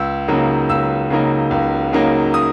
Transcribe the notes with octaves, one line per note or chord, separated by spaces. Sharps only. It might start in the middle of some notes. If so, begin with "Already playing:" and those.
Already playing: C#2 E6
C#3 F#3 A#3 D#4
C#2 E6
C#3 F#3 A#3 D#4
C#2
C#3 F#3 A#3 D#4
D#6